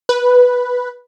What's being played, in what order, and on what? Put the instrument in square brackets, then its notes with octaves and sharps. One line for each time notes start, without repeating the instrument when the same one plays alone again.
[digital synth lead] B4